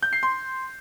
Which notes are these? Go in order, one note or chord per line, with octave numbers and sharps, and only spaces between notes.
G6
C7
C6